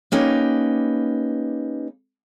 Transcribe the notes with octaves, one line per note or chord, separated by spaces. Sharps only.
A#3 C#4 D#4 G4 B4